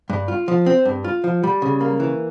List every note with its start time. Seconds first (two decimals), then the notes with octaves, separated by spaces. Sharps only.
0.10 G2
0.28 F4
0.48 F3
0.66 C4
0.85 G2
1.04 F4
1.24 F3
1.44 G3
1.62 C#3
1.81 A#3
2.00 E3